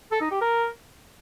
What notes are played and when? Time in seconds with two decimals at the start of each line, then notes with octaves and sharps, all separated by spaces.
0.11 A4
0.21 D#4
0.31 G4
0.41 A#4